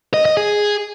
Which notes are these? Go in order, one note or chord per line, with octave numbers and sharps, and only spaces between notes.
D#5
D#5
G#4